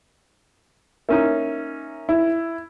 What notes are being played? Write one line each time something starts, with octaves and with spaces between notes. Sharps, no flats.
A#3 C#4 D#4 E5
E4